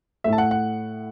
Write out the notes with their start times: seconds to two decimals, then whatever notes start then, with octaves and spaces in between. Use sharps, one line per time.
0.24 A2 A3 E5
0.33 A5
0.38 F#5
0.51 F#5